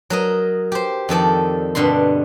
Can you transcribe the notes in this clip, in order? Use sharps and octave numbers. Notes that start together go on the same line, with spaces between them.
F#3 A#4 D#5
G4 C5
F2 D#3 A4 D5
G2 B2 D3 B5 C6